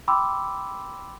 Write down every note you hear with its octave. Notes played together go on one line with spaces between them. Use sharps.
G5 B5 C6 D6 E6